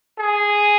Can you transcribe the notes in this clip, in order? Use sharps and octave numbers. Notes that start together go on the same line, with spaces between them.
G#4